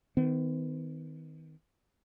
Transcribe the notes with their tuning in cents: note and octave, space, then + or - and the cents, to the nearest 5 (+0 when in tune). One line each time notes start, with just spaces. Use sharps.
D#3 +20 B3 +40